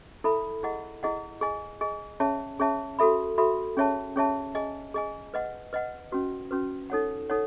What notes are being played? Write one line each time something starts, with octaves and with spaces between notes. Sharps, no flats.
E4 A4 E5 B5
E4 G#4 D#5 F#5
E4 G#4 D#5 F#5
G#4 D#5 G#5
G#4 D#5 G#5
C#4 G#4 C#5 E5 A5
C#4 G#4 C#5 E5 A5
F#4 A4 E5 B5
F#4 A4 E5 B5
C#4 G#4 C#5 E5 A5
C#4 G#4 C#5 E5 A5
G#4 D#5 G#5
G#4 D#5 G#5
B4 D#5 F#5
B4 D#5 F#5
C#4 F#4 B4
C#4 F#4 B4
D#4 A4 C#5 F#5
D#4 A4 C#5 F#5